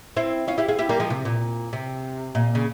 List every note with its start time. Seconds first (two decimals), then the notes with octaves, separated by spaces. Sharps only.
0.16 C4 E4
0.48 C#4 F4
0.58 E4 G4
0.68 F4 G#4
0.79 E4 G4
0.89 G3 A#3
1.00 F3 G#3
1.10 C3
1.25 A#2
1.73 C3
2.35 A#2
2.55 C#3